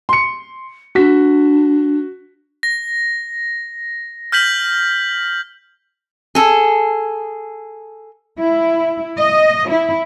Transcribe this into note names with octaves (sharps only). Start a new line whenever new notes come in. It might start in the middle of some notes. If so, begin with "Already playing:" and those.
C6 C#7
D4 F#4 B6
A#6
F6 G6 B6 F#7
G#4 A4
E4
D#5
E4